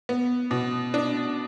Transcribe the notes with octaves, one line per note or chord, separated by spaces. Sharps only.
B3
B2
D4